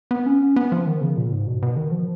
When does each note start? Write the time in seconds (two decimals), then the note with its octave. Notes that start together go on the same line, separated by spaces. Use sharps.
0.11 B3
0.26 C#4
0.56 B3
0.72 F3
0.87 D#3
1.01 C#3
1.17 A#2
1.32 G#2
1.46 B2
1.62 B2
1.76 D#3
1.92 F3